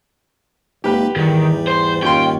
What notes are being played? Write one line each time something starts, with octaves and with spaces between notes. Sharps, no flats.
F1 G#3 A#3 D#4 G4 B4
E2 G#2 D#3 G3
C5
D#2 C#4 F4 G5 C6